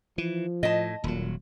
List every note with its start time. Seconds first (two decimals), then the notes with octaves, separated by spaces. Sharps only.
0.18 E3 F3
0.63 A2 D#5 A5
1.04 D#1 A#2 F#3